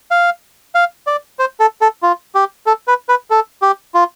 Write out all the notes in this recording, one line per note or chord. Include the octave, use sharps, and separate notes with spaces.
F5
F5
D5
C5
A4
A4
F4
G4
A4
B4
B4
A4
G4
F4